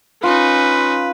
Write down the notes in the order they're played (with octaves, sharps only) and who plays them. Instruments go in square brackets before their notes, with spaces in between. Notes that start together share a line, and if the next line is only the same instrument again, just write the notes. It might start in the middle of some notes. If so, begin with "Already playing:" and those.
[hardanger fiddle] C#4 D#4 [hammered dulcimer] F4 [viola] B4